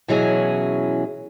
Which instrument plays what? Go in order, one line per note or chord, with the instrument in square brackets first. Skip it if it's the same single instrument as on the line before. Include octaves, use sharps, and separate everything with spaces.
[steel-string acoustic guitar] B2 E3 F#3 C#4 E4 G#4